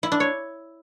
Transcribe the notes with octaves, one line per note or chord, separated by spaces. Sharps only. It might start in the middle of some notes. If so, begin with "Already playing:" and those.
E4
D4
C#5